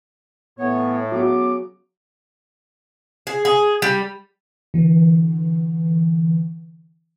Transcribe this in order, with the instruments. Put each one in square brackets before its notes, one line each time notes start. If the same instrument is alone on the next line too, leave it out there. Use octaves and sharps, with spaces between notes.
[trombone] A2 [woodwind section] E3 B3 C#5
[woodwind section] C#3 B3 D6 [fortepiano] F#3
[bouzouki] G#4
G#4
G3
[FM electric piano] D3 E3